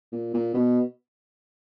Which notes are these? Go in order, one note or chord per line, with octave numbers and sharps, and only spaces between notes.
A#2
A#2
B2